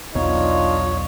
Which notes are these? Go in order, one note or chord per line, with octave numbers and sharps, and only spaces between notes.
B1 E2 B3 D4 D#4 F4 C#5